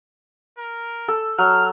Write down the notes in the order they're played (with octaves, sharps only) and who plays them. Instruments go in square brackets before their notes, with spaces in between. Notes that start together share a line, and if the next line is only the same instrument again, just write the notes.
[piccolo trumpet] A#4
[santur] A4
[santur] F#3 [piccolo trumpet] F6